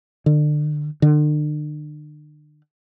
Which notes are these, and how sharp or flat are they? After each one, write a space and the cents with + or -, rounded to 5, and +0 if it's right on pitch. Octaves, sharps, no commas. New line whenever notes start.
D3 +30
D3 +40